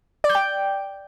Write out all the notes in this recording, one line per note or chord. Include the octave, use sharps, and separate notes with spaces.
D5
G6
G5